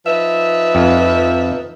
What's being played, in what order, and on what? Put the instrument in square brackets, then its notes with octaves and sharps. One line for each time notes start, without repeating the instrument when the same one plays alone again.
[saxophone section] F3 D#4 E5 [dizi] B4
[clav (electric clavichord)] F2